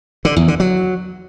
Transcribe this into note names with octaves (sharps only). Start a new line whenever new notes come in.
D3
E2
D3
F#3